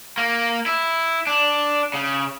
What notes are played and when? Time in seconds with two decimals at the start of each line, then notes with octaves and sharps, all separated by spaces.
0.18 A#3
0.66 E4
1.27 D4
1.94 C#3